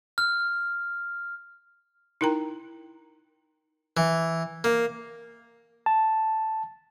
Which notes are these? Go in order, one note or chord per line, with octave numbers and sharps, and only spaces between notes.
F6
D#4 E4 A#4 G5 A#5
E3
A#3
A5